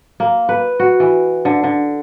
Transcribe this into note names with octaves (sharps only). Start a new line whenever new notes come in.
A#3
B4
F#4
E3
D3
D3